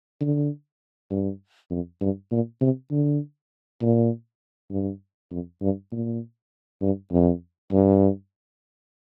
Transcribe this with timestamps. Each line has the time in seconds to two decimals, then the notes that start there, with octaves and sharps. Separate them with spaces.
0.21 D3
1.11 G2
1.70 F2
2.01 G2
2.31 A#2
2.61 C3
2.91 D3
3.82 A#2
4.71 G2
5.31 F2
5.62 G2
5.92 A#2
6.82 G2
7.12 F2
7.72 G2